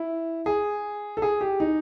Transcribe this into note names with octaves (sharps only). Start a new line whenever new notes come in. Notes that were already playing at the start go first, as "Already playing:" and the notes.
Already playing: E4
G#4
A4
G#4
G4
D#4